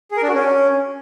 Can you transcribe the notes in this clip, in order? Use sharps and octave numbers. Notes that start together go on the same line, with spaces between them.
G#4
A#4
D4
F#4
C#4